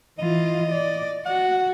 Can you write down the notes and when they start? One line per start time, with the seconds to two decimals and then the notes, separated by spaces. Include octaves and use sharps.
0.19 E3 F4 D#5
0.71 D5
1.26 F#4 F#5